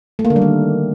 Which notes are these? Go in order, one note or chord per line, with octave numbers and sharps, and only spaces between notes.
A3
A#3
D3
G3
D#3